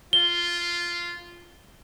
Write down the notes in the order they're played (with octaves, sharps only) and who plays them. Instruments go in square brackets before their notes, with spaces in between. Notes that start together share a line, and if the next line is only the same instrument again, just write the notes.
[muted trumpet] F4 [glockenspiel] G7